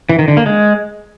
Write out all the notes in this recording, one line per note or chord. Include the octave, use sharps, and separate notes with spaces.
E3
D#3
D3
A#3
G#3